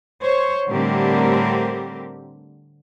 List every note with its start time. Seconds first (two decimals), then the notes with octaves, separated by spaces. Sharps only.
0.22 C5 C#5
0.69 A2 D3 G3 C4 G4 A#4